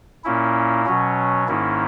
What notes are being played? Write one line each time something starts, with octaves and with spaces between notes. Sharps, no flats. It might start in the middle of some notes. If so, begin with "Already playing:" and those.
A#2 A#3 C#4 E4
B2 F#3 C#4
G#2 D#3 A#3 C#4 E4